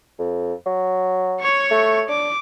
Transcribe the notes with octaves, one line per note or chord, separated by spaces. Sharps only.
F2
F#3
C#5 C#6
A3
D4 D6